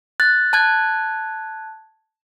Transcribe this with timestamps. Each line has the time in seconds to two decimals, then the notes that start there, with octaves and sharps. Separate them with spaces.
0.20 F#6 A6
0.53 A5 F#6 G#6